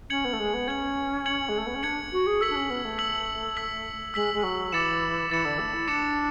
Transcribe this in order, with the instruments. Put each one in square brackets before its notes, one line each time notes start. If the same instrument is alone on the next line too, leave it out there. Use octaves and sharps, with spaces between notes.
[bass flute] C#4 [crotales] G#6 C#7 F#7
[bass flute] B3
A3
G#3
B3
[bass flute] C#4 [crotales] G#6 C#7 F#7
[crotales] G#6 C#7 F#7
[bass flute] G#3
A3
B3
C#4
[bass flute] D4 [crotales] G#6 C#7 F#7
[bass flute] F#4
G#4
[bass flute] A4 [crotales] E6 B6 F#7
[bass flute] D4
C#4
B3
A3
[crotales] E6 B6 F#7
E6 B6 F#7
[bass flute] G#3 [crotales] E6 B6 F#7
[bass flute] G#3
F#3
[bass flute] E3 [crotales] D6 A6 C#7 E7
[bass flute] E3 [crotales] D6 A6 C#7 E7
[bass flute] D3
A3
E4
[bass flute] D4 [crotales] D6 A6 C#7 E7